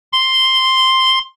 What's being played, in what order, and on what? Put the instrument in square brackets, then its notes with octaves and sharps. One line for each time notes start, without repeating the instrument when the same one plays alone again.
[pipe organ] C6